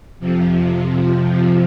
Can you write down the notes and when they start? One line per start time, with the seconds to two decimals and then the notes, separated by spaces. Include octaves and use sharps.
0.20 F2 C3 F3